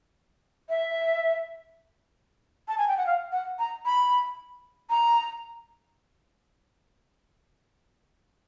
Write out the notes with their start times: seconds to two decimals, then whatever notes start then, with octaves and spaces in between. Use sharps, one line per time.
0.69 E5
2.68 A5
2.78 G#5
2.88 G5
2.97 F#5
3.06 F5
3.32 F#5
3.59 A#5
3.85 B5
4.90 A#5